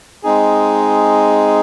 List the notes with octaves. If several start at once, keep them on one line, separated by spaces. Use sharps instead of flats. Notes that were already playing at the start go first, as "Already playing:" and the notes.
G#3 C4 D#4 G#4